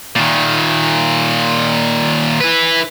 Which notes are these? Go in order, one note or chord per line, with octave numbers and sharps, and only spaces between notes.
A#2 D#3
E4 B4